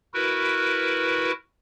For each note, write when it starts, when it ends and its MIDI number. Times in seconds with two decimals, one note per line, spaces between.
0.14 1.32 64
0.14 1.32 66
0.14 1.32 70
0.14 1.32 71